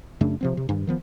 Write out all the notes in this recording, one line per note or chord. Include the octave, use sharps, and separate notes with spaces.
F#2 C#3 A3 D4
C3 F3 C4
C3
G2 D#3
D#3 F3 B3